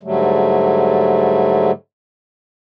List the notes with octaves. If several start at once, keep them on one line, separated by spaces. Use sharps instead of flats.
G#2 D3 F#3 G3 A3